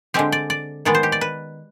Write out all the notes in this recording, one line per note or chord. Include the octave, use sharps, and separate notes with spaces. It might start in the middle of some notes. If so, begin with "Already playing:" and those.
D3 G#3 C4 G4
D5
D5
D#3 G#3 B3 D5
C5
G4
D5
B4